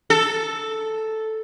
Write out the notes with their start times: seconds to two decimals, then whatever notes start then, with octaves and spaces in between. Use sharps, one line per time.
0.10 A4